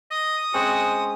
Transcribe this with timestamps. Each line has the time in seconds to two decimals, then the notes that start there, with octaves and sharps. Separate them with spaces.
0.11 D#5 D#6
0.54 G#3 C4 C#4 F#4